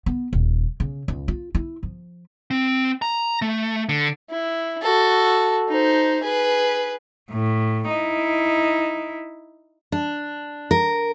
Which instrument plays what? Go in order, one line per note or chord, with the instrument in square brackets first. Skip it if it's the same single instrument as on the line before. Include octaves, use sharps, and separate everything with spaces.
[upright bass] B3
D#1
C#3
C#2
F4
E4
F3
[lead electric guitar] C4
A#5
A3
D3
[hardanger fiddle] E4
F#4 A4
D#4 C5
G#4 B4
[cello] A2
D#4 E4
[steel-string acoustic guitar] D4
A#4